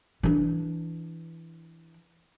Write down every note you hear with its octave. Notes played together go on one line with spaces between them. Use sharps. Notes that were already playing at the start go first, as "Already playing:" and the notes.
E3 D4